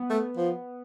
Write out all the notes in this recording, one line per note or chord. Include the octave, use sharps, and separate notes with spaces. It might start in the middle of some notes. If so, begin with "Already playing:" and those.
Already playing: B3
A3
F3